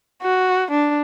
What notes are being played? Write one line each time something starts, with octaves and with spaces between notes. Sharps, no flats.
F#4
D4